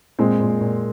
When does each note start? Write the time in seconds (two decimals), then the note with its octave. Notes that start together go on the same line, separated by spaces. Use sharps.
0.19 A#2 G#3 C4
0.40 A#2
0.61 A#2